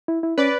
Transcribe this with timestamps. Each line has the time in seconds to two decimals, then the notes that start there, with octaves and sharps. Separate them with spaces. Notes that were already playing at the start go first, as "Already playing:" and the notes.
0.08 E4
0.23 E4
0.38 C#4 B4 D5